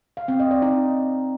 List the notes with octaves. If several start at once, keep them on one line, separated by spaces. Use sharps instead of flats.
F5
C4
D#5
D5
D#4